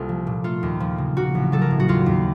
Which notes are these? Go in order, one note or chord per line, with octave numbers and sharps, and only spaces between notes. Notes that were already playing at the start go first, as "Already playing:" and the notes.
Already playing: C2 A#3 F4 A4
F3
A#2
A3 F4
D#2
F3
C#3
A#3 F#4
A1
F#3 A4
A#4
A2
F#4
D#2 F4
D#2